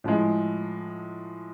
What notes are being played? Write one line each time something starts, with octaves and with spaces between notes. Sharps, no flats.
A2 F3 G#3